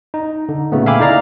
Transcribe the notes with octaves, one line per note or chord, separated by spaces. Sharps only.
D#4
D3
A#2 C#3 A3 B3
E5 F5 G5 G#5 B5 D6
D#4 E4 A4 D5 F5 A#5